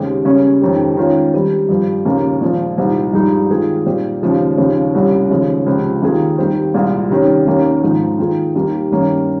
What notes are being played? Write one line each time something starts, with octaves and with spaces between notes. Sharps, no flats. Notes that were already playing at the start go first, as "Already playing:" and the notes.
Already playing: D#2 C#3 G#3 C4 G4
C#3 G3 A#3 C#4
F2 D#3 G#3 C#4 G4
D#3 G#3 C#4 F4
D#3 G3 C4 G4
G2 F3 C4
D#2 C#3 F3 A#3
A#2 F3 G#3
C2 A#2 G3 C4 D#4
G2 F3 G#3 D#4 G4
D#3 G#3 C4 F4 G#4
A#2 G3 C4 D#4 G4
D#2 C#3 F3 G#3
D#2 C#3 F3 C4
C2 A#2 G3 C#4
D#2 C#3 F3 G#3
C#2 C3 F3 C4
D#2 D#3 A#3 F4 G#4
D#2 D#3 G3 C4
C2 A#2 G#3 C4 F4
C3 D#3 G3 C#4
D#2 D#3 A#3 C#4
G#2 F3 G#3 C4 D#4
D#3 A#3 F4 G#4
D#2 D#3 G3 A#3
G2 D#3 A#3 C#4